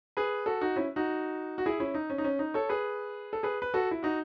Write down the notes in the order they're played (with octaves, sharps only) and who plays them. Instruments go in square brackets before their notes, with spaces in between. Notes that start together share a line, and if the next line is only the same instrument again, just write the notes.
[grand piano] G#4 B4
F#4 A4
D#4 F#4
C#4 E4
D#4 F#4
F#4
E4 G#4
C#4 E4
D#4
C#4
D#4
C#4
D#4
A4 C#5
G#4 B4
A4
G#4 B4
B4
F#4 A4
E4
D#4 F#4